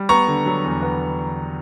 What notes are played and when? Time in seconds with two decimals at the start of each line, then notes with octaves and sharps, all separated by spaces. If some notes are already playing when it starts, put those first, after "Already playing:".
Already playing: G3
0.09 B3 A#5 C#6
0.28 D3
0.46 F#3
0.64 E2
0.82 B3